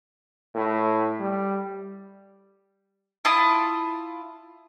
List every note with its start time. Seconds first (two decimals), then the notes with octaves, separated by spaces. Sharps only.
0.55 A2
1.19 G3
3.25 E4 F4 A5 D#6